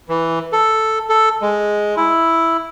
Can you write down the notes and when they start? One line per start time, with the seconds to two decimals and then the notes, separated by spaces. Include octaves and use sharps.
0.09 E3
0.53 A4
1.10 A4
1.42 G#3
1.97 E4